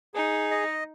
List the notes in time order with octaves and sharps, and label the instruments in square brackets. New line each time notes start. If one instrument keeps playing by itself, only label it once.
[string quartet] D#4 [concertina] G#4
[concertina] D#5